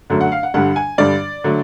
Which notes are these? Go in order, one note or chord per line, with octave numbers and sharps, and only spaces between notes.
F#2 D3 F#3 A3
F#5
F5
F#5
G2 D3 G3 F#5
G#5
G2 D3 G3 D5
D3 F#3 A3